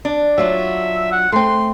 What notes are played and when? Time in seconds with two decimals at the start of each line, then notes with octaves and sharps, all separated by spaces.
0.05 D4
0.38 F#3 F4 F#4 E5
1.12 F#5
1.32 A3 C4 C6